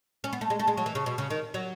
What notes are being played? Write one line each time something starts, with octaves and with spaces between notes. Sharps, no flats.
C#4
B3
A3
G#3
A3
G#3
F#3
E3
C#3
B2
C#3
D#3
F#3